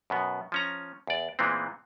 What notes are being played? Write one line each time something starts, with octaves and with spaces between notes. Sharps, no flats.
F#2 B2 B3
F3 C#4 A#5
E2 D5
A#2 E3 G#3 B3 C4